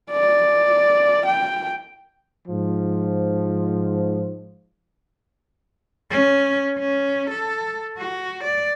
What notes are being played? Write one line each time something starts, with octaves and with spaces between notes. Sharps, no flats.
D5
G5
G#2 F3
C#4
C#4
A4
F#4
D5